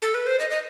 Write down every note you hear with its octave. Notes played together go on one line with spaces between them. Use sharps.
A4
B4
C5
D#5
D#5